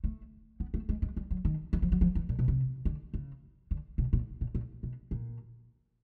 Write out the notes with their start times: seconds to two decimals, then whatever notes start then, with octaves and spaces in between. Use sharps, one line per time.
0.04 A3
0.60 B3
0.74 A3
0.89 G#3
1.02 G#3
1.17 G3
1.31 F#3
1.45 D#3
1.73 E3
1.82 F3
1.92 F#3
2.01 F3
2.15 E3
2.29 A#2
2.39 B2
2.48 C3
2.85 D3
3.14 C#3
3.71 D3
3.98 B2
4.13 A#2
4.41 A#2
4.55 A#2
4.83 B2
5.11 A#2